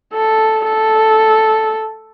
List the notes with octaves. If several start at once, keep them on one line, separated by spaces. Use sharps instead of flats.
A4
A4